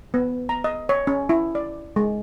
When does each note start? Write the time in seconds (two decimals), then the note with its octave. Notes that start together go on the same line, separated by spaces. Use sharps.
0.14 B3
0.49 A#5
0.64 D#5
0.89 C#5
1.07 C#4
1.29 E4
1.55 D5
1.96 G#3